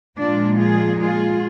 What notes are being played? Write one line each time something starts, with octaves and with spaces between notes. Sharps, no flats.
A#2 F3 G#3 D4 F4
F4 G#4
F4 G#4